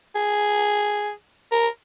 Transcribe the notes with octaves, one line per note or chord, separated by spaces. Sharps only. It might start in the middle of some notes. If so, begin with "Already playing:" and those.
G#4
A#4